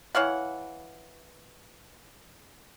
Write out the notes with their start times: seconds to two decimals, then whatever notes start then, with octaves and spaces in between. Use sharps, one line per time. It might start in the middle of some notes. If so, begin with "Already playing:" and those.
0.15 E3 C#5 F5 F#5